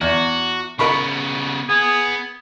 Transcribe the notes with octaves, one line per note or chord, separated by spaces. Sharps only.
E2 F#4
C#3 B3 A#4 B5 C#6
B3 G#4